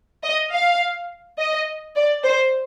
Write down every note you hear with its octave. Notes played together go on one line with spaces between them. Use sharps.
D#5
F5
D#5
D5
C5